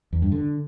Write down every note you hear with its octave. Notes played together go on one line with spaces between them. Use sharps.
E2
G2
D3